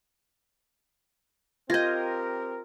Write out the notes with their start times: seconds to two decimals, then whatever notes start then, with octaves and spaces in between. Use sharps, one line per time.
1.70 C4 F4 G4 A#4 D#5 G6 G#6 A#6